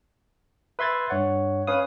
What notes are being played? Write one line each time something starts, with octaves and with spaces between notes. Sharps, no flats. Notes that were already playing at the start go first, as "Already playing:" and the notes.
B4 E5 C6 G#6 A6
G2 C#5 F#5
C#4 B4 C#5 F5 D#6